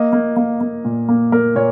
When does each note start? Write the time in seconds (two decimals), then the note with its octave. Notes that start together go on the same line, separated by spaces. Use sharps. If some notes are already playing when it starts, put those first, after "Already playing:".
Already playing: A#3 D#5
0.13 A#3
0.36 A#3
0.61 A#3
0.85 A#2
1.09 A#3
1.32 A#3 A#4
1.55 A#2 C#5